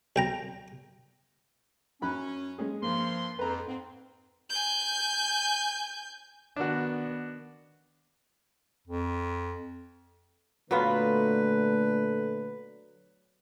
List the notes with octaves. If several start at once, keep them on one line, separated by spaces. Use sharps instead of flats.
B1 G5 A#5
F#2 C#4 B5 F#6
G#3 C#4 G#4
G2 F3 A#3 C6
F2 B4 A#5
G#2 C4
G#5 G6
D#3 B3 D4 F#4
F2
A#2 D3 F#3 A3 B3 F4 B4